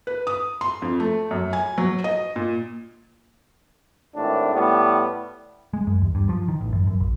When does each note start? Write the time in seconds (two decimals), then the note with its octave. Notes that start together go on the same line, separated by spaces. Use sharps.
0.07 B4
0.27 D#6
0.61 C6
0.82 F2
1.00 A3
1.31 F#2
1.53 G#5
1.78 F#3
2.04 D#5
2.36 A#2
4.16 G#1 A2 D4
4.53 A2 G3 B3
5.73 G#3
5.87 F#2
6.01 D#2
6.15 G2
6.29 F3
6.48 D#3
6.61 A1
6.72 F#2
6.87 F#2
7.00 A#1